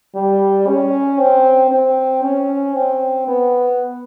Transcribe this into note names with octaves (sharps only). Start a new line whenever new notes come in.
G3
C#4
C4
C4
C#4
C4
B3